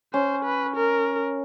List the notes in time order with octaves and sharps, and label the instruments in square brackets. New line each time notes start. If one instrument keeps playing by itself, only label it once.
[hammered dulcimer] C#4 [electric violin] C5
[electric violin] B4
A#4